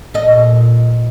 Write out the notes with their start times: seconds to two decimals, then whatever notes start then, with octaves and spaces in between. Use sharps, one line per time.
0.14 A#2 A4 D#5